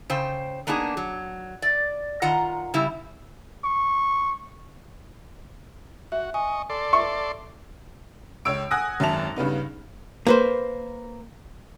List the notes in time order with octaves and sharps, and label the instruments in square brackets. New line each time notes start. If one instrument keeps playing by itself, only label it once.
[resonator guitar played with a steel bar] C#3 C5 G5
A#3 B3 D4 D#4 G#4
F#3
D5
D#3 F4 F#5 A#5
C#3 G3 E4
[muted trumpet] C#6
[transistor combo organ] F#4 [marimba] E5
[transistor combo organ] D#5 C#6 [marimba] G#5
[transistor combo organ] A4 D5 C6
[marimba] E5 [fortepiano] C#6
[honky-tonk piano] C#2 C#5 E6 D7
F#5 G#5 D#6 F#6 A#6
G#1 F#2 E5 A5 F7
G2 C#3 B3 D#4
[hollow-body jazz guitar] A#3 B4 C5